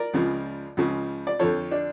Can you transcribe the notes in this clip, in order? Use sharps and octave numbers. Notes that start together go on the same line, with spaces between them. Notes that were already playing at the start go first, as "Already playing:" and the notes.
Already playing: A#4 D5
C#2 C#3 F3
C#2 C#3 F3
D5
F2 D3 F3 A4 C#5
D4